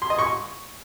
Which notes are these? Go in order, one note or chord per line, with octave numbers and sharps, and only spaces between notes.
C6
D#5
C#6